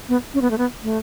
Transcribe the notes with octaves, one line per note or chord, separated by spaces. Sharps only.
B3
C#4
B3
A3
B3
A3